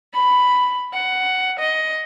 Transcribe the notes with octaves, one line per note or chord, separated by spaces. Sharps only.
B5
F#5
D#5